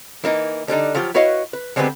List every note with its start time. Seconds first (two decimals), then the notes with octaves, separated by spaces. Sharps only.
0.24 E3 A#3 D#4
0.68 D3 G3 D4 D#4
0.95 F3 F#3 F4 G4
1.14 E4 F#4 B4 C#5 D#5 F5
1.53 B4
1.76 D3 G#3 B3 C4 G4 B4